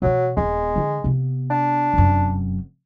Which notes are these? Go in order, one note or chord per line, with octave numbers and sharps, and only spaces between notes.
B2 E3 F#3
D#1 G#3 B3
D3 E3
C3 B3
D4
F1 F#2